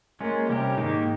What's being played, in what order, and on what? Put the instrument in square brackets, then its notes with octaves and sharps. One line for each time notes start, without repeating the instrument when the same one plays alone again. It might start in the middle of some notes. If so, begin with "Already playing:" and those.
[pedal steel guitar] G#3 C#4 F4 [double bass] A#3
[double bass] C3 [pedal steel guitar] G3 C#4 G4 A#4
[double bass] G#2 [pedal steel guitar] D#3 A#3 D#4 G4